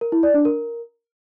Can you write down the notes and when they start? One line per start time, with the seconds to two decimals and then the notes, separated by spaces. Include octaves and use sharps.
0.01 A#4
0.12 E4
0.23 D5
0.34 D4
0.45 A#4